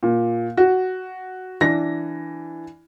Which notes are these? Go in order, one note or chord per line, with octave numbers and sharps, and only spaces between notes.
A#2
F#4
E3 D4 A#6